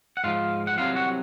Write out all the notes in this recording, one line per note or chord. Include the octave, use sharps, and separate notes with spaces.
F#5
G#2 F3 F4 F5
F#5
C2 C3 F#3 F4 F5
F#4 F#5